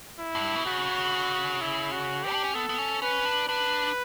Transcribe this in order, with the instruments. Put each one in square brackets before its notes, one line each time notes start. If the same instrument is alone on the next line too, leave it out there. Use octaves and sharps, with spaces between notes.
[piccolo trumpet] E4
[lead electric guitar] G2
B2
[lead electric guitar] C#3 [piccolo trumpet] F#4
[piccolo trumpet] E4
F#4
G4
[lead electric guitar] D4
C#4
[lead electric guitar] B3 [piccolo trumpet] A4
[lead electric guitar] B3
C#4
[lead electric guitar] C#4 [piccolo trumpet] B4
[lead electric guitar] D4
[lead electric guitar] D4 [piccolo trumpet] B4